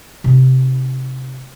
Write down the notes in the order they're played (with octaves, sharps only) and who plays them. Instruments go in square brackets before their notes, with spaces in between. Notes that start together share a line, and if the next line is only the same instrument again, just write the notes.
[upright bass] C3 D#4